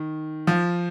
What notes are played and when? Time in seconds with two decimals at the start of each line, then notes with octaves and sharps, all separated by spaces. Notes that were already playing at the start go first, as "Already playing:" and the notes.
Already playing: D#3
0.47 F3